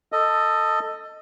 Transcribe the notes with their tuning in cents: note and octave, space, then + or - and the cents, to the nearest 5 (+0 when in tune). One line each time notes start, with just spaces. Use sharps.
A4 +15 D#5 +0